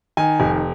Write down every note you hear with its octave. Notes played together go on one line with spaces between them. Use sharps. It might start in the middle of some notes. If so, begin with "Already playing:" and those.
D#3 G#5
F1